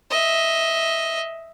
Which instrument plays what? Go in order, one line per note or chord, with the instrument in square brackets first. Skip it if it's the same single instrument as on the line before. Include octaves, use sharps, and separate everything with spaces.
[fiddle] D#5 E5